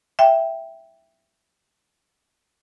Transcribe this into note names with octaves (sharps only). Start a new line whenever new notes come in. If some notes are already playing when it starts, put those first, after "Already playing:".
E5 G5